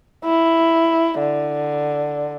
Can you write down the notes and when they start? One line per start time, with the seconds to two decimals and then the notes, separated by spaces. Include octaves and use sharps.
0.25 E4
1.19 D3